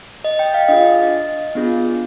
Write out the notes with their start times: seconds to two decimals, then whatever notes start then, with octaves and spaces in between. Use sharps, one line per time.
0.25 D#5
0.39 G5
0.54 F5
0.68 D4 F4 G#4 D#5
1.55 B3 D4 F4 G#4